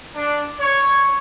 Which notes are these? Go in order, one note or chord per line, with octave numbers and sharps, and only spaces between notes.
D4
C#5